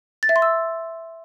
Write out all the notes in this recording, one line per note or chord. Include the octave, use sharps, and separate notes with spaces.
A6
E5
C6
E6